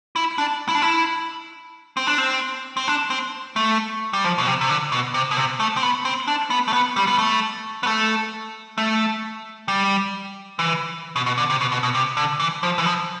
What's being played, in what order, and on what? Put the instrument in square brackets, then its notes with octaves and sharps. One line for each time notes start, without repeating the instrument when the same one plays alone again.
[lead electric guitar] E4
D4
E4
D4
E4
C4
D4
C4
C4
D4
C4
A3
G3
F3
B2
C3
C3
D3
B2
C3
B2
C3
A3
C4
B3
C4
D4
B3
A3
B3
G3
B3
A3
B3
A3
A3
G3
E3
B2
B2
D3
C3
B2
B2
B2
C3
D3
E3
F3
E3
F3